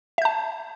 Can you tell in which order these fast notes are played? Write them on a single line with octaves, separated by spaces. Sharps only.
E5 G6 A5